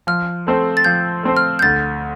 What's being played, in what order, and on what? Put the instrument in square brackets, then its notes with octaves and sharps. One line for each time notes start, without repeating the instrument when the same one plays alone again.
[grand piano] F3 [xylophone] F6
[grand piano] A3 C4 A4 C5
[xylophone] A6
[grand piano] F3 [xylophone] G6
[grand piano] A3 C4 A4 C5
[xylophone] F6
G6
[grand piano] D2 [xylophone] A6